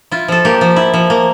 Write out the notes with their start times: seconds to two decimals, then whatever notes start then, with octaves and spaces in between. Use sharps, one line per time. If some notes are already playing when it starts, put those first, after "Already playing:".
0.11 E4 F4
0.28 F3 A4
0.45 A#3 G4
0.61 F3
0.76 E4
0.94 F3
1.10 A#3